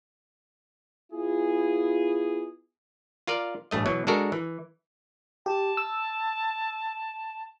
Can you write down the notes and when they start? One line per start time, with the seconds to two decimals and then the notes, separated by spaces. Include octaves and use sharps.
1.13 B3 E4 F4 G#4
3.27 F4 A#4 D5 F5
3.71 A1 G2 A3 D#5
3.86 B2 E3 F#3
4.07 G#3 D4 F#4 A4 A#4
4.32 E3
5.46 G4 A5
5.77 E6